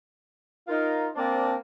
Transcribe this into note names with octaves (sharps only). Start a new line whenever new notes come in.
D#4 F4 A#4
A#3 C4 D4 C5 D5 A5